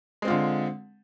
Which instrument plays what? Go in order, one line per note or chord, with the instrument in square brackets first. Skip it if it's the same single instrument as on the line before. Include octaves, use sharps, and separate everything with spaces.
[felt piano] G#3
C4
F4
D3